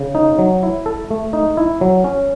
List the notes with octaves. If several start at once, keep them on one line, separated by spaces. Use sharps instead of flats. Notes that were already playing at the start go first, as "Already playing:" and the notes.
Already playing: C#3
D#4
F#3
E4
A4
A3
D#4
E4
F#3
C#4